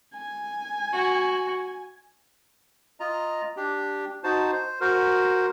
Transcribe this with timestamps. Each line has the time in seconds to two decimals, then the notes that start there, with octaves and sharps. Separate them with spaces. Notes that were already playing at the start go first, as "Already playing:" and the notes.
0.14 G#5
0.92 F#4
3.00 F4 D#5 A#5
3.57 D4 G4
4.24 D#4 F#4 C5 A5
4.52 C5
4.81 F#4 A#4 C5